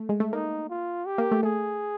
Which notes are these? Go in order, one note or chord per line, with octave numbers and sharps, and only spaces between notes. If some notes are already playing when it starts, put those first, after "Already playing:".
Already playing: A3
G#3
A3
A#3 D#4
F4
G4
A#3
A3
A3 G#4